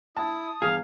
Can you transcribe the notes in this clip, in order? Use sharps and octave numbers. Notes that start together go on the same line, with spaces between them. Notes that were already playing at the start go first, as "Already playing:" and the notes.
E4 A5 D#6
E2 G2 G#4 F5